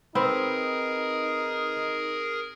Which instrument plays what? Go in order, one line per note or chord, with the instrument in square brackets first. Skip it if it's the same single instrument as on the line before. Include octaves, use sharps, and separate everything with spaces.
[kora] C4 [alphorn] D#4 [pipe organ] G#4 A#4 [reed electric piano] B4 B5